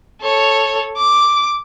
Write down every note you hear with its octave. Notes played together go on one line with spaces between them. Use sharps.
A4 C#5
D6